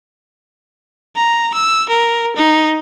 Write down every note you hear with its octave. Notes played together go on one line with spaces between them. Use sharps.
A#5
E6
A#4
D#4